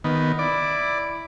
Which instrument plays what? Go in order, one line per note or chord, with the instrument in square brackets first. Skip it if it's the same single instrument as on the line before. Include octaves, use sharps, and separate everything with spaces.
[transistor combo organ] D#3 B3
[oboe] E4 [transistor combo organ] D5